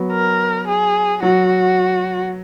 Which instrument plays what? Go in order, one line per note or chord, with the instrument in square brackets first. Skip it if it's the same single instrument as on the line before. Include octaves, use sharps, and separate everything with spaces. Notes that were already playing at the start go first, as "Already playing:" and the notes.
Already playing: [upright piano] F#3 B3
[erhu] A#4
G#4
[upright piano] F#3 [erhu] F#4